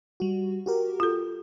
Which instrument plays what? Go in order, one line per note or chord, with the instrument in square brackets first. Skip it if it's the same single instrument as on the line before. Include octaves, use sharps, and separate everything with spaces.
[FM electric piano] G3 F#4
F#4 G4 A#4
[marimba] F4 A4